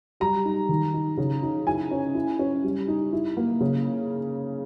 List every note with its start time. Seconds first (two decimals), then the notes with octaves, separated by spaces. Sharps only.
0.20 G3 A#5
0.45 D#4
0.69 D#3
0.94 D#4
1.17 C#3
1.43 D#4
1.66 E4 G#5
1.91 C#4
2.15 E4
2.39 C#4
2.63 G3
2.88 D#4
3.13 E4
3.37 A#3
3.61 C#3